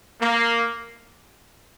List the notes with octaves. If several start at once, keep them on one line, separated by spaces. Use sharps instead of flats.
A#3